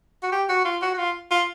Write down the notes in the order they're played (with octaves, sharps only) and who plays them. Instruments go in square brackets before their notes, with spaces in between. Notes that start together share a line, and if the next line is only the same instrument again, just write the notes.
[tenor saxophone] F#4
G4
F#4
F4
F#4
F#4
F4
F4